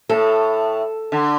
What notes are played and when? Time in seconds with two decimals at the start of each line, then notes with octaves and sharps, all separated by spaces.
0.09 A2 A4
1.12 D3